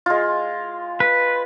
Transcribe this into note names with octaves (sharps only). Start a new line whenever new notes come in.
G#3 F4
B4